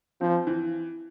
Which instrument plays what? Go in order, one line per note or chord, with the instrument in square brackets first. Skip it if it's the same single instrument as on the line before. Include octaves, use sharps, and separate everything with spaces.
[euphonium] F3 [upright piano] C4
[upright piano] E3